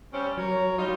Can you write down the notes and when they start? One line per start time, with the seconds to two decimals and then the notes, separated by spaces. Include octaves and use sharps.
0.13 G3 C4 C#4
0.37 F#3 A#4 C#5
0.77 G3 D#4 F4